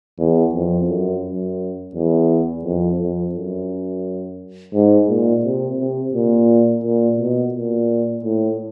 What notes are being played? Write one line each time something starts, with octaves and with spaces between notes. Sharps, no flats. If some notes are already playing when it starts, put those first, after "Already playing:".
E2
F2
F#2
F#2
E2
F2
F2
F#2
G#2
A#2
C3
C3
A#2
A#2
B2
A#2
A2